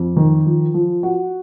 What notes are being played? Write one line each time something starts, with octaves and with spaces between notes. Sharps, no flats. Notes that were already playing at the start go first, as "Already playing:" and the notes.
Already playing: F2
D#3
F3
F3
F#4